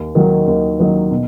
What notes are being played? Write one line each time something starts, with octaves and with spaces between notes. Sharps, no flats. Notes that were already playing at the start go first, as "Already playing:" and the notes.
Already playing: D#2
D#3 F#3 A#3 D#4
D#2
D#3 F#3 A#3 D#4
B2